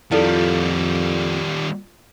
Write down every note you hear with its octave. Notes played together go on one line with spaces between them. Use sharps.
F2 D#3 G3 E4 F4 A4 D5 F5